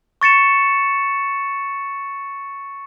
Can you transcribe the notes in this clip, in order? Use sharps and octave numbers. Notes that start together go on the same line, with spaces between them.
C#6 A6 C#7 E7